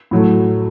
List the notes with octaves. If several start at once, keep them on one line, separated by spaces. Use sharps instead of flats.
A2 F#3 A3